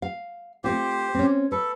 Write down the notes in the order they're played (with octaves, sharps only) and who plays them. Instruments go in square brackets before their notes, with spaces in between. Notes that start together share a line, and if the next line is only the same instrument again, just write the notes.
[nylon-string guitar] F5
[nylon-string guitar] A3 C4 F4 [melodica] G4 C5
[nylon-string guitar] C4 C#4
[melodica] A4 [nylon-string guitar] B4